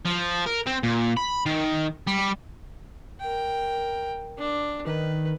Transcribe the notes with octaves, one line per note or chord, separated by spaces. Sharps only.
F3
A#4
C4
A#2
B5
D#3
G3
A#4 G5
D4
D#3 B4